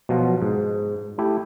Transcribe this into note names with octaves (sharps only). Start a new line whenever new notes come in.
B2 F3 F#3 F4
G#2
A3 E4 G4